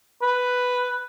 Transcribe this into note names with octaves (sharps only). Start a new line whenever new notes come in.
B4